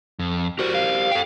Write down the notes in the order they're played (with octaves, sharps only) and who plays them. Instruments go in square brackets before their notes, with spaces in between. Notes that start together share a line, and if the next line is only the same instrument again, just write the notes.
[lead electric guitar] F2
[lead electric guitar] F#4 [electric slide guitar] G4 A#4 C5
[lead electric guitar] F5
[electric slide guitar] A4 G5